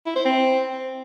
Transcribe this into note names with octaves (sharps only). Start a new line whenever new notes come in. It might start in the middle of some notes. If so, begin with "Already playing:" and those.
E4
C5
C4